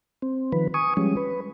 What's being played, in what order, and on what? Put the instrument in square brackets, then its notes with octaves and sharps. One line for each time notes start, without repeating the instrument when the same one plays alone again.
[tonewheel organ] C4
D#3 F3 B4
G#5 C#6 D#6
F3 G3 G#3 C#4
B4